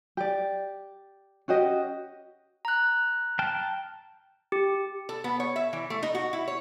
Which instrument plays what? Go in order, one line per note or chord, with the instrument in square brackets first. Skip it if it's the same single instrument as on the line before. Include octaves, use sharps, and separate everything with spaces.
[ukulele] G4 D5
C#4 F#4 G4 D#5
[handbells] A#5 F#6
[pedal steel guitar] G5 A5 F6
[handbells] G4
[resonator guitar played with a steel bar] A4
B3
C#5
E5
E3
A3
D#4
F#4
E4
C#5